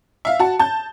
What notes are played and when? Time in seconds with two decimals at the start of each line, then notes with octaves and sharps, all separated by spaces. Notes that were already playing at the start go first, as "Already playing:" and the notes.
0.25 E5 F5
0.39 F#4 A5
0.59 A5 G6